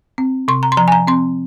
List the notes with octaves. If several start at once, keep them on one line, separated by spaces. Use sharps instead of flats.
C4
C3 C6
A#5
C6
F3 A#5
G#5
A#5
C4 C6